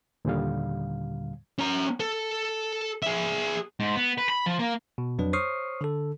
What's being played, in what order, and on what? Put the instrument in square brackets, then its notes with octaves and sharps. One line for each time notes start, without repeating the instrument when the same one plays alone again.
[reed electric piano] D#2 A#2 D3 G3 F5
[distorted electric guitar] C#4 A#5
A4
G#4 E5
G#2
B3
B4
B5
F3
A#3
[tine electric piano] B2
F2 F#3 D4 B4
C5 C#5 C#6 D#6 F6 C7
D3 A4